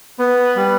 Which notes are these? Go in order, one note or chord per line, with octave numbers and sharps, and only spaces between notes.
B3 B4
G3